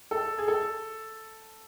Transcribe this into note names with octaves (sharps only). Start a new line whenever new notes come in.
A4
G#4
A4